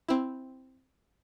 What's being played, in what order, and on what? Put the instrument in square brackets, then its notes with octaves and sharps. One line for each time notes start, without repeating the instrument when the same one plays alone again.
[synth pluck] C4 E4